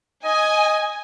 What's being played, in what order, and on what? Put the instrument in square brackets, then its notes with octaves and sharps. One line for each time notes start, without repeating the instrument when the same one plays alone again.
[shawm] D#5 [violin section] G#5